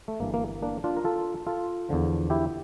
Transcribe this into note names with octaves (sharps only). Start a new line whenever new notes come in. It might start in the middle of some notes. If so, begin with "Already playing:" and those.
A3
G1 G2 E3 A#3
A#3
A#3 D4
D4 F4
A#4
F4 A4
F4 A4
E2 D3 F3
E4 G4